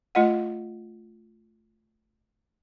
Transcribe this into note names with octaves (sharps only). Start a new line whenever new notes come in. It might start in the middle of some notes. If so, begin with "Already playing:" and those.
A3 F4 D#5 F#5